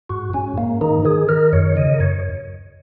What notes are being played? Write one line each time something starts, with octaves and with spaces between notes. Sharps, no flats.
G#2 F#4
G#2 C#4
G#2 A#3
D#3 D#4
D#3 G#4
D#3 A#4
F#2 C#5
C#3 D#5
A#4
F#2 C#5